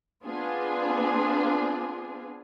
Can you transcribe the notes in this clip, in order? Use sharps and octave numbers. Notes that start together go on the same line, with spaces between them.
B3 C4 D4 F4 G#4